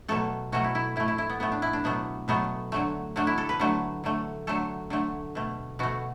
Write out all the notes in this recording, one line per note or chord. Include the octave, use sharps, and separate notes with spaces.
B2 F#3 A3 A4
B2 F#3 A3 F#4
E4
E4
A2 A3 E4
E4
E4
B3
A2 A3 B3
D4
E4
D4
B2 F#3 A3 B3
B2 F#3 A3 B3
D3 F#3 A3
D3 F#3 A3 D4
E4
A4
B4
D3 F#3 A3
D3 F#3 A3
D3 F#3 A3 A4
D3 F#3 A3
B2 A3
B2 A3 F#4